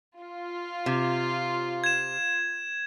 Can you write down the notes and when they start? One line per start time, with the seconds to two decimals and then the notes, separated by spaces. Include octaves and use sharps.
0.19 F4
0.86 C3
1.84 G#6 E7